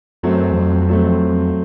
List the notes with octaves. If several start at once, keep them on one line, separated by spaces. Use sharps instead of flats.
F#2 F#3 A3 C4
E2
F2
F#3 A3 C4